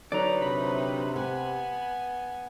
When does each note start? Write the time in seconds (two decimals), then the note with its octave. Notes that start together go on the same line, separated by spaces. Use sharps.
0.12 D3 F#3 D#4 B4 D5 A#5
0.42 C3 B5
1.16 B3 B4 G#5